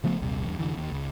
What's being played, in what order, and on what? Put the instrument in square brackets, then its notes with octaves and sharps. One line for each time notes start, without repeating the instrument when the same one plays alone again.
[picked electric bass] C#3 F3 A3 B3
A#1 D#2 C3 G3
E2 G2
F1 A#1 D3 E3
D#2
C#2